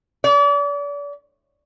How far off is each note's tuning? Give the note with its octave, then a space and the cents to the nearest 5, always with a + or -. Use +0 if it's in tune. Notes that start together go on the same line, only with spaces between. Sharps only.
D5 -40